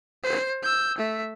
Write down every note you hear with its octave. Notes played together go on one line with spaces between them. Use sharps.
C5
E6 G6
A3 E5